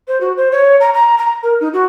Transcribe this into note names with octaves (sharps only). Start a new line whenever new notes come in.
C5
F#4
C5
C#5
A#5
A#5
A#5
A#4
D#4
F#4